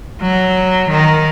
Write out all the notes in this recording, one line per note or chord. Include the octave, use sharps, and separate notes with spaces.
F#3
D#3